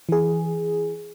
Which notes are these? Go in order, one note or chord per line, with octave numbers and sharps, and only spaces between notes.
E3 G#4